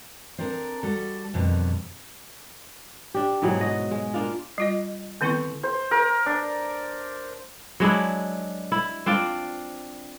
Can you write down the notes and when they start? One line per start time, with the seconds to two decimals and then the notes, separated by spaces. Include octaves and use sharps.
0.38 C4 D4 A4 A#4
0.83 G3 F#4 A4
1.34 F2 B2 D3 D#3 G3
3.14 D4 G4
3.42 G#2 B2 E3 F#3
3.60 F#4 D#5
3.91 G#3
4.14 A#3 D4 F4
4.58 G3 F4 D#5
5.21 D3 D#3 B3 C4 E4 C#6
5.63 C5
5.91 A#4
6.26 D4
7.80 F#3 G#3 D4 E4
8.72 E4
9.06 C4 D4 F4 D5